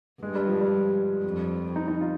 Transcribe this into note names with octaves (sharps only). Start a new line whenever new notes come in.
G2 G#3
G3
F3
G3
F2
D#4
D#4
F4